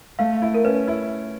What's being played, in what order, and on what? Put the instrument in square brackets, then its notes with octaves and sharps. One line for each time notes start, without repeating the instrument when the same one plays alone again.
[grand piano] A3 [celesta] F5
[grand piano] E4
[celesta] A#4
[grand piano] C#4 [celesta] B4
[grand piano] E4